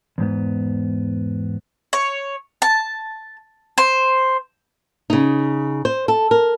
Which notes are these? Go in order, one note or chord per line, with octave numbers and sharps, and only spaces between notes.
E2 G#2 B3
C#5
A5
C5
C#3 D#4
C5
A4
A#4